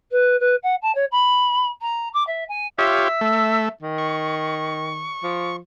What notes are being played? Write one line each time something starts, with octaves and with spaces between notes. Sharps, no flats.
B4
B4
F#5
A5
C#5
B5
A#5
D6
E5
G#5
F4 G4 C#5 E5
A3
D#3
C#6
F3